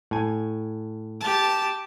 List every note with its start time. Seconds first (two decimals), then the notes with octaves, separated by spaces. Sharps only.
0.11 A2 G#5
1.21 G4 A5